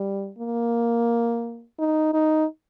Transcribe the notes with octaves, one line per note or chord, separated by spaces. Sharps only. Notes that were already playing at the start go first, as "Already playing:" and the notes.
Already playing: G3
A#3
D#4
D#4